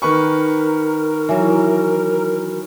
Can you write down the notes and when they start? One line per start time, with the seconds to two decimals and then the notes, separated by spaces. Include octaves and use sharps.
0.02 D#3 A#4 B4 C#6
1.29 E3 F#3